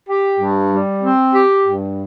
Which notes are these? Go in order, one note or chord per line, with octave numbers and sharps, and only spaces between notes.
G4
G2
G3
C4
G4
G2